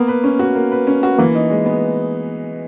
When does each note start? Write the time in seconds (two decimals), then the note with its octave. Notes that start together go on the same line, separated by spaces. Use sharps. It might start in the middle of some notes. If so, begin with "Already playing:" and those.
Already playing: A#3 B3
0.08 B4
0.24 C#4
0.39 F#4
0.55 A#3
0.72 B4
0.87 C#4
1.03 F#4
1.19 E3 A#3
1.35 D#4
1.50 G#3
1.66 B3